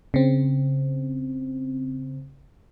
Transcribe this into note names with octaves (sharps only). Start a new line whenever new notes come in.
C#3 C4